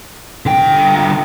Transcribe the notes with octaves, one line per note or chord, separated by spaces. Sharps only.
D3 G5